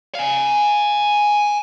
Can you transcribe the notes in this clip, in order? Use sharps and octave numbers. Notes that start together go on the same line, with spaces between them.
F5 G#5